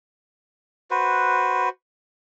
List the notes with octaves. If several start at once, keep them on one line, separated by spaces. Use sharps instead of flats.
F#4 B4 C5